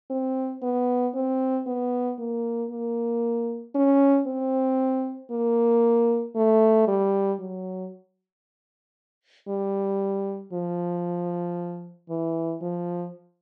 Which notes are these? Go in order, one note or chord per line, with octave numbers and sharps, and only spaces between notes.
C4
B3
C4
B3
A#3
A#3
C#4
C4
A#3
A3
G3
F#3
G3
F3
E3
F3